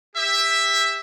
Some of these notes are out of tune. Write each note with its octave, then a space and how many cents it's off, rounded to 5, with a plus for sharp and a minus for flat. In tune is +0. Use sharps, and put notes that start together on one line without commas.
G4 +30 E5 +0